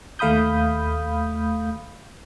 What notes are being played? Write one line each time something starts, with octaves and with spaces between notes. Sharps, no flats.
D#2 A3 F5 B5 D#6 G6